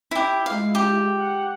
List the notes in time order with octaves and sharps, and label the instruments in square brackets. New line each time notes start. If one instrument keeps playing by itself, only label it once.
[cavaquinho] E4 G4
[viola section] G#3 E4 F4 [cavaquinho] F5
[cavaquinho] G4
[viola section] F#5